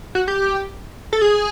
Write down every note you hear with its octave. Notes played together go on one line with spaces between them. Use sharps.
F#4
G4
A4
G#4